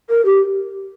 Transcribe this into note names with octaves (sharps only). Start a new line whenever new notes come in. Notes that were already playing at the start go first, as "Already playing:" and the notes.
A#4
G4